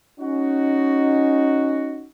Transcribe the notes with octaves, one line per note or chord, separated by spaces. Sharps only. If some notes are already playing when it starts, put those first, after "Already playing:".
C#4 D#4 F#4